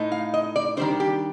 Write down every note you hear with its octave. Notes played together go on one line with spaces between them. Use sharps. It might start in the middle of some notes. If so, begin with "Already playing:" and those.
Already playing: A2 A3 D#4
F5
D#5
D5
D#3 G3 D4 C5
G4